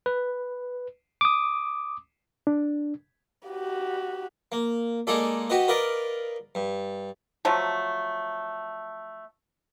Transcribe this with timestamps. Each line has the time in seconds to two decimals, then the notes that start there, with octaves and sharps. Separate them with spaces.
0.06 B4
1.21 D6 D#6
2.47 D4
3.48 F#4 G4
4.52 A#3
5.07 G#3 A#3 D#4 G#4 A4 D5
5.50 F#4 G4 B4 D#5
5.68 A#4 B4 D5 D#5 F5
6.55 G2
7.45 F3 F#3 A3